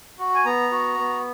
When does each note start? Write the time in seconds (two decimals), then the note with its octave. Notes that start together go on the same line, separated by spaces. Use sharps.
0.19 F#4
0.35 G#5
0.45 B3 A#5
0.72 F#4
0.99 B3